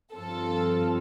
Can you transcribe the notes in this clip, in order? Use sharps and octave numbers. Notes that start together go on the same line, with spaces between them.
G2 F3 C4 F4 A4